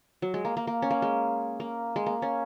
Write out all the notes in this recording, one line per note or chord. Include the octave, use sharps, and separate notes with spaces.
F#3
G#3
A#3
A#3
A#3
C#4
A#3
G#3
A#3
G#3
A#3
C#4